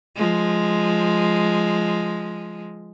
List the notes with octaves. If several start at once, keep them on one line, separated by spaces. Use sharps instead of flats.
F3 G#3